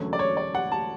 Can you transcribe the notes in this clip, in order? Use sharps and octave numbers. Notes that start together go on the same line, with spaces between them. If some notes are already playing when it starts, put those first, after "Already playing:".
Already playing: E1 D2 D3 F#3 C#4
D5
C#5
D5
F#5
A5